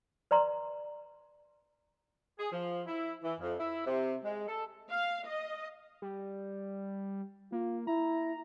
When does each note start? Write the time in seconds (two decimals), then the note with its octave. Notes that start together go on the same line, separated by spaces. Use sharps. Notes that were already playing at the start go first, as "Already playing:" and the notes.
0.31 B4 D5 A#5 C6
2.39 G#4
2.52 F3
2.86 E4
3.23 E3
3.40 F2
3.59 E4
3.86 C3
4.25 G#3
4.48 A4
4.90 F5
5.27 D#5
6.02 G3
7.52 A#3 F4
7.87 E4 A#5